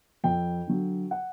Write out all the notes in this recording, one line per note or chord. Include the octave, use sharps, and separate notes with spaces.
F2 G5
D3 F#3
F#5